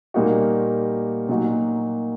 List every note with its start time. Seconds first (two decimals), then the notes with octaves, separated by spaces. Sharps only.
0.14 A#2 G3 A#3 D#4 F#4
1.29 A#2 F#3 A#3 D#4 F#4